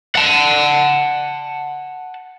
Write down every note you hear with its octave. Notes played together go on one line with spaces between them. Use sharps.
F#5 A5